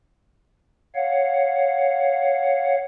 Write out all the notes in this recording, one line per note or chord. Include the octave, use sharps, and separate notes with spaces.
C#5 F5 F#5